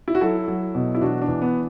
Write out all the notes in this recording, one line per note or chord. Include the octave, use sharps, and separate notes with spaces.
E4
F#4
F#3 E4 A4
F#3
B2
E4
E3 D4 F#4
D4
E3
B3